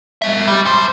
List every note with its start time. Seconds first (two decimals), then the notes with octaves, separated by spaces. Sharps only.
0.22 F#3 E5
0.47 G3
0.65 F#2 C5